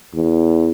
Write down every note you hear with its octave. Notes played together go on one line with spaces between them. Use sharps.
E2